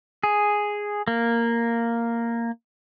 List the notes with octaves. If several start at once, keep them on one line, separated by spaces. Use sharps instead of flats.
G#4
A#3